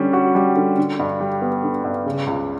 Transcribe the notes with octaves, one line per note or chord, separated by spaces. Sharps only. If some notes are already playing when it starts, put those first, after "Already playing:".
Already playing: D3 G3 C#4
F#4
G3
D3
D3
G2
G3
B3
D3
G2
C#3
C#2